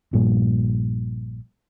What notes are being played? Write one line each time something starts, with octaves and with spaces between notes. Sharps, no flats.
A#1 G2 A#2